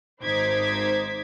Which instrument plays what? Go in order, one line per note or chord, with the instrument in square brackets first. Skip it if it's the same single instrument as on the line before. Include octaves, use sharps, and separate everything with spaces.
[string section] G#1 D#4 C5 D6 G#6 B6